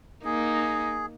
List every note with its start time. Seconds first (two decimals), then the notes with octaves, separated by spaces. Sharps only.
0.25 A#3 D#4 G#4